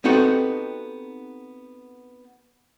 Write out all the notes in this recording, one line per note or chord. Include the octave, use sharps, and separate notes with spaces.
B3 C4 D#4 F#4 G4 A4